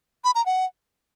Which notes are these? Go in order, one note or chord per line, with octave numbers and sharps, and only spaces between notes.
B5
A#5
F#5